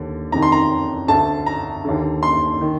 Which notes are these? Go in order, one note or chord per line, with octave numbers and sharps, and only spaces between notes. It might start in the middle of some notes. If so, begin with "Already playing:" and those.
Already playing: D#2 D3
F2 C3 D#3 A#5
C6
A#5
D2 D3 A5
A#5
D#2 D3
C6
D#3